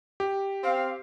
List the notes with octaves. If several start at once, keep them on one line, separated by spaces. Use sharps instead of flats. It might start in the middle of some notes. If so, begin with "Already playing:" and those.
G4
C4 F5